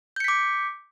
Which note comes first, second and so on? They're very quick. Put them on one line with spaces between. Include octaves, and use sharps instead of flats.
G6 C#7 B6 D6